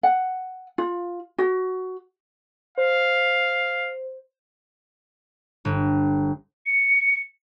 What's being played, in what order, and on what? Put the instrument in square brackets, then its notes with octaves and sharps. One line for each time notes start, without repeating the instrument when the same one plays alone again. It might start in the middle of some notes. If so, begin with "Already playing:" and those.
[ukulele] F#5
F4
F#4
[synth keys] C5 [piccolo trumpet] F5
[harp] G1
[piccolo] C#7